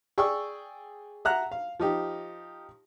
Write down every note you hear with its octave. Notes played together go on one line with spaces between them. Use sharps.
G#4 D5 G5 C#6 D#6 E6
E5 F#5 A#5 F#6
F5
F3 D#4 G4